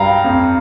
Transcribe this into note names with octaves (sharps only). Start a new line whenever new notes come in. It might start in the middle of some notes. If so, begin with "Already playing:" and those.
Already playing: G2 G3 F5 G5 A#5
F2